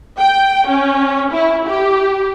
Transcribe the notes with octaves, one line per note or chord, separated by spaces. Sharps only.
G5
C#4
E4
G4